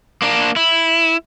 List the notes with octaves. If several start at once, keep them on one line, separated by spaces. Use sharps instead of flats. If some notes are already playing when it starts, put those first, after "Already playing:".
A#3 D4
E4